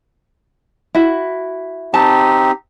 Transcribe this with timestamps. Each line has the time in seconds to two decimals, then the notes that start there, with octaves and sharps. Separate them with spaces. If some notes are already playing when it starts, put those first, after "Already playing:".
0.95 E4 F#4
1.94 C4 D#4 G4 A5